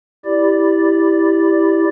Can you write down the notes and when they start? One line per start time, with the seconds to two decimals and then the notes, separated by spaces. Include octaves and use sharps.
0.25 E4 G4 D5